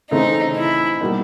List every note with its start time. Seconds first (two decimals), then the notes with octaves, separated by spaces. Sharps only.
0.11 C#3 E3 A3 C4 D#4
0.57 E4
1.01 B2 G3 A#3 D#4